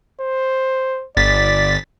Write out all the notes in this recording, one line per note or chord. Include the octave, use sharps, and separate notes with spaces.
C5
G1 D5 A6 B6